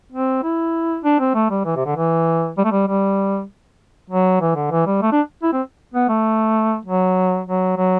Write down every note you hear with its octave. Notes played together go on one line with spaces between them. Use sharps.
C4
E4
D4
C4
A3
G3
E3
C3
D3
E3
G3
A3
G3
G3
F#3
E3
D3
E3
G3
A3
D4
E4
C4
B3
A3
F#3
F#3
F#3